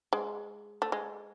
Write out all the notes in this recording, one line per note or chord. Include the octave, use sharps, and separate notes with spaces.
G#3
A3
G#3